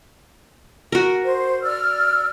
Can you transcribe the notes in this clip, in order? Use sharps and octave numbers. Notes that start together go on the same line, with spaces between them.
F#4 A#4
C5
D5 E6 F6